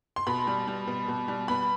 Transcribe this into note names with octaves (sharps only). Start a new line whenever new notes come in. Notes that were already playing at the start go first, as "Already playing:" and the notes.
C6
B2 B5
G3
G3
B2
B2
G3
B3 B5